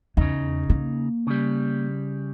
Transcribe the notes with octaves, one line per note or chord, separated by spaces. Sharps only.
E2 C#3 D#4
A#3
C#3 G3